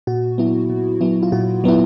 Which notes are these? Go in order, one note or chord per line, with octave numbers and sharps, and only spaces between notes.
A#2 F#4
F#3 B3 E4
A#2
F#3 B3 E4
F4
A#2 F#4
F#3 B3 E4